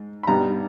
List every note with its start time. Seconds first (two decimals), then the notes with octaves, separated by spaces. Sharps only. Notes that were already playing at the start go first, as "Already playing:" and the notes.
Already playing: G#2
0.23 B5
0.27 G2 G3 B3 D#4 A#5